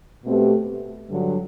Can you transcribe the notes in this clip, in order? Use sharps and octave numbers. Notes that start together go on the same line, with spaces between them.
B2 A3 C4 G4 B4
G2 D3 F#3